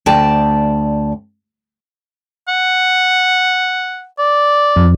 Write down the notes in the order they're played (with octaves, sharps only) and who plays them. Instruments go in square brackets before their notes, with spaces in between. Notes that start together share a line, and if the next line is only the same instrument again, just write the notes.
[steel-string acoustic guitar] D2 D5 G5 A5
[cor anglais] F#5
D5
[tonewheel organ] F2